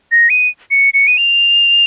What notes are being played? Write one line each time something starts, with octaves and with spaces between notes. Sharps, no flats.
A#6
D#7
C#7
C#7
D#7
F7